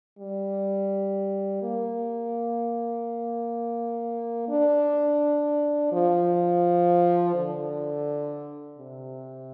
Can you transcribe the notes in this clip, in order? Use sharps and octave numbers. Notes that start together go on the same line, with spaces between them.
G3
A#3
D4
F3
D3
C3